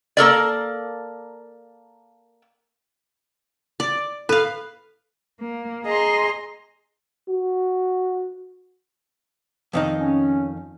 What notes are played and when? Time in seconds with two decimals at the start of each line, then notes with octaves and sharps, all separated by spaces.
0.17 A#3 A4 A#4 D5
3.80 D5
4.29 A4 B4 F5
5.41 A#3
5.85 G#4 D#5 A#5 C6
7.28 F#4
9.73 F2 D#3 D#4
9.99 C#4